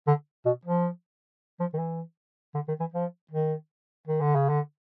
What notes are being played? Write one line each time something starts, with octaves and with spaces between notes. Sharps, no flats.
D3
B2
F3
F3
D#3
E3
D3
D#3
E3
F3
D#3
D#3
D3
C#3
D3